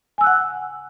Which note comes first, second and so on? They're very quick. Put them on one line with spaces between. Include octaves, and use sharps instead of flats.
G#5 E6 F#6 F#5